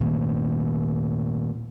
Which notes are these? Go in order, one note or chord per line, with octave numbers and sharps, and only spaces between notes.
A#2 D#3 A3 A#3